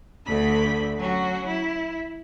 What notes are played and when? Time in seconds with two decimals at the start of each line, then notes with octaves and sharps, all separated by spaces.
0.25 D2 D3 B5
0.97 F#3 C#4 F#4
1.46 E4